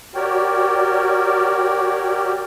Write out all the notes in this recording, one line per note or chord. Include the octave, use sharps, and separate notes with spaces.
F#4 G4 A#4 C#5 D5 G5